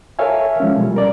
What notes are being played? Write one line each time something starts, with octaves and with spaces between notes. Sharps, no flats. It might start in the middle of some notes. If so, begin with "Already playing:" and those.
A4 A#4 C#5 E5 F5 G#5
F3 G#3 C#4
B2 G3
A#4 D5